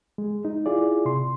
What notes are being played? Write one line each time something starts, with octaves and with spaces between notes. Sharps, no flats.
G#3
D#4
E4 F4 G#4 D5
C3 C6